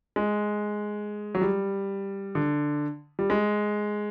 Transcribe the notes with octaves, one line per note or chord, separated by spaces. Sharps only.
G#3
F#3
G3
D3
G3
G#3